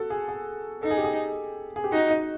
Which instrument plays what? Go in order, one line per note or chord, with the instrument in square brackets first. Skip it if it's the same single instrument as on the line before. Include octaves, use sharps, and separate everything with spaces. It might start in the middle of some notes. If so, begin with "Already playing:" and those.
Already playing: [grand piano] F#4 A4
G#4
G#4
[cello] D#4 [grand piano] A4
[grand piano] G#4
G4
G#4
G#4
G4
[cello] D#4 [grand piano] F#4
[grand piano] D#4